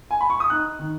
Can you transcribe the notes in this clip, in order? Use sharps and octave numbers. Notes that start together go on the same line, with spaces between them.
G#5
B5
C#6
D#6
D#4 F#6
D#3